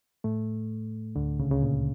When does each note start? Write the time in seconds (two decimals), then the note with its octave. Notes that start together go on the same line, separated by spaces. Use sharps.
0.24 A2 A3
1.16 D2 D3
1.39 C#2 C#3
1.51 C#3
1.62 A#2